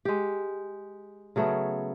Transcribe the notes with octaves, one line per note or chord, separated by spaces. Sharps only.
G#3 G4
C#3 F#3 A3 B3